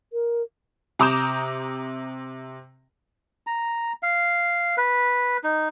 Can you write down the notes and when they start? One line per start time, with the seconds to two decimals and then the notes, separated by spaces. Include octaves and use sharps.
0.13 A#4
0.99 C3 A#5 D6 D#6 G6 E7
3.47 A#5
4.03 F5
4.77 B4
5.44 D#4